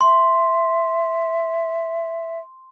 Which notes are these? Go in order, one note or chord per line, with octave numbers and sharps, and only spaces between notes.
E5 C6